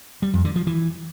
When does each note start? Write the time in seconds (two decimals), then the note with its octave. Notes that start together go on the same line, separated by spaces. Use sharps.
0.22 G3
0.33 F2
0.45 D3
0.56 F3
0.67 E3